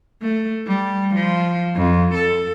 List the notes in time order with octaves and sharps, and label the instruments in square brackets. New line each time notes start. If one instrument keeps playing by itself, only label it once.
[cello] A3
G3
F3
F2
A4